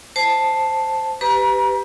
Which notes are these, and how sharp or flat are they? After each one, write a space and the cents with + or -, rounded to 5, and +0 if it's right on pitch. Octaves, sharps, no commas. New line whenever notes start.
C5 +0 A5 +0
G4 +0 B4 +20 A#5 +35